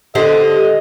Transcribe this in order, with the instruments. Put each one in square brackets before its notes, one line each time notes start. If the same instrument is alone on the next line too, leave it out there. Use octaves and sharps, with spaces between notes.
[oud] D3 G4 C5 [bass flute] A4 [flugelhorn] D#5